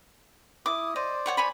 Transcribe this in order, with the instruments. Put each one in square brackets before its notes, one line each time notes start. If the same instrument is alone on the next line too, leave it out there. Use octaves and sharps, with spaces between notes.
[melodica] E4 D#6 [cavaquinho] D6
[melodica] C5 D5 [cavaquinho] D#5
[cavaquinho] C#5 F#5 C#6
C#5 G#5 B5